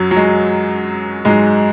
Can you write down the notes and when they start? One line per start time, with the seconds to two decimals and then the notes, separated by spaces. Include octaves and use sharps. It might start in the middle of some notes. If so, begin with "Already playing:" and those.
Already playing: F#2 F#3
0.11 F#3
0.16 G#3
1.25 G#2 F#3 G#3